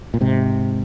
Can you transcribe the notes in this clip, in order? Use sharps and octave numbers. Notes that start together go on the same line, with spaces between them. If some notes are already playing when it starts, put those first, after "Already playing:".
A#2
G#2 C3